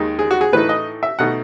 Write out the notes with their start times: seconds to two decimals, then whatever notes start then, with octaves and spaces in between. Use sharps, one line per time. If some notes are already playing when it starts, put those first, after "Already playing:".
Already playing: D#2 D#3 G#3 D#4
0.19 G#4
0.31 F#4
0.41 G#4
0.52 A2 E3 A3 D#4 B4
0.69 D#5
1.03 E5
1.19 B2 A3 D#4 F#5